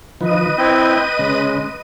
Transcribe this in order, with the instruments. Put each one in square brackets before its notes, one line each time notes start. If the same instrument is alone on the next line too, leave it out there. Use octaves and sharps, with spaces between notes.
[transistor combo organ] D#3 F3 [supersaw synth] B4 D#5 D#7
[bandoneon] C4 E4 [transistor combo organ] G5
[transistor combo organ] C#3 [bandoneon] G#3